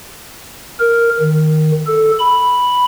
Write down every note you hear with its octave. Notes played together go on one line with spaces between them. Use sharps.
A#4
D#3
A4
B5